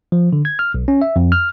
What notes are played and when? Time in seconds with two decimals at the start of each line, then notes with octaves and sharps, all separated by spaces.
0.12 F3
0.33 D3
0.45 G#6
0.59 F6
0.74 B1
0.88 C#4
1.02 E5
1.16 F2
1.32 F6